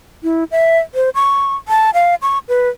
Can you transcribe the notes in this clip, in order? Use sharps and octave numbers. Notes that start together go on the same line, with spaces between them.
E4
E5
C5
C#6
A5
F5
C#6
B4